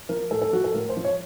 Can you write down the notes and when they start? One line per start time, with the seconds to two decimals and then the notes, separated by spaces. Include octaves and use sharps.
0.09 F3 A#4
0.31 A2 A4
0.42 A4
0.53 F3 F#4
0.64 A4
0.74 A2 A#4
0.89 C5
0.97 F3
1.04 C#5